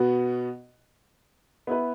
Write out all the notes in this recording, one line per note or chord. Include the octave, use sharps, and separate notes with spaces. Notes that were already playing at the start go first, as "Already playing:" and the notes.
Already playing: B2 B3 F#4
B3 E4 B4